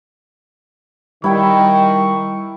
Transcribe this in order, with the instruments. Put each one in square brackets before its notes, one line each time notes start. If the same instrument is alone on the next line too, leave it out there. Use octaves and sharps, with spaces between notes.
[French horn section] D#3 [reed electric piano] G3 [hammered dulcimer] E4 G5 [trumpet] C#6